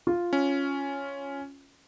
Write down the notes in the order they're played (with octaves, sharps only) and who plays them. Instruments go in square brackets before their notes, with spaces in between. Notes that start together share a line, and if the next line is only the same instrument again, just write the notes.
[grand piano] F4
[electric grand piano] C#4